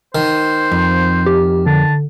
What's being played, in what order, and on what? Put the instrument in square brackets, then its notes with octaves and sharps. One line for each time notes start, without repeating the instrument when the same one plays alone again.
[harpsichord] D#3 [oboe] C5
[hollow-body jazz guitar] F2
[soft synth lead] G4
[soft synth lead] D3 [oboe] A5